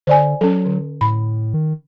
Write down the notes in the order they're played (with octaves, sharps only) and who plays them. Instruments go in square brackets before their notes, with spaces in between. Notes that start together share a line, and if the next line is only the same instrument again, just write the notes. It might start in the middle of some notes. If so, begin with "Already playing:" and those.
[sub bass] D3 [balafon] C5 D5 G#5
[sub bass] F#3 [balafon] C#4 A4
[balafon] D3
[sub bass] A2 [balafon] B5
[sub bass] D#3